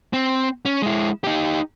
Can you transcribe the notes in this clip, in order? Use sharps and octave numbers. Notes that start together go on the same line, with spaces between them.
C4
C#4
G#3 E4
D#4 G4